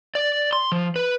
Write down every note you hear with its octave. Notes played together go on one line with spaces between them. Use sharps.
D5
C6
F3
B4